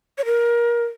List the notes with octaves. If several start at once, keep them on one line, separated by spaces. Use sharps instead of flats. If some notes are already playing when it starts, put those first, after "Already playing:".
C#5
A#4